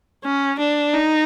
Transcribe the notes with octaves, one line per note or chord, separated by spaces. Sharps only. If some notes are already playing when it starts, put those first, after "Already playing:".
C#4
D4
D#4